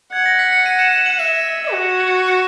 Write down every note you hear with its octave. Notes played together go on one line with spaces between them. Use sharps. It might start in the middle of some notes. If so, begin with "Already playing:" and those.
F#5 G#6
A#6
B6
C#7
D#7
E7
E7
F#7
E5 E7
F#4
E7